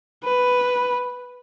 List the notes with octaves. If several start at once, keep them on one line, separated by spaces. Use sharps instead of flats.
B4